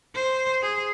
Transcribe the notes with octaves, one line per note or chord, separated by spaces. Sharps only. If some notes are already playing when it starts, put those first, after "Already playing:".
C5
G#4